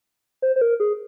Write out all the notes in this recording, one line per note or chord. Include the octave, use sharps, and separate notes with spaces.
C5
C5
A#4
G#4